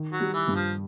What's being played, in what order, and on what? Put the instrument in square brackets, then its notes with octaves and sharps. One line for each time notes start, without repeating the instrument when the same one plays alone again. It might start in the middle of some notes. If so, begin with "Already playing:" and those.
Already playing: [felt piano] D#3
[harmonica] F#3
[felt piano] G3
[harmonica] E3
[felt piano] G2
[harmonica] F3